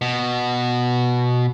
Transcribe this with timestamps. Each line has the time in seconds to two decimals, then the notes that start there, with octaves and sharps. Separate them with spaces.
0.02 B2